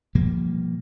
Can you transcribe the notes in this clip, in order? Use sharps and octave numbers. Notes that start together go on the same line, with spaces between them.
B2 F3 G3 A#3